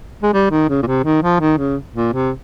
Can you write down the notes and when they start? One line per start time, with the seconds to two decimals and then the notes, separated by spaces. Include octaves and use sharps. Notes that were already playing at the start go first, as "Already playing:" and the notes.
0.23 G#3
0.33 G3
0.51 D#3
0.69 C#3
0.82 A#2
0.86 C3
1.04 D#3
1.22 F3
1.40 D#3
1.58 C#3
1.94 A#2
2.13 C3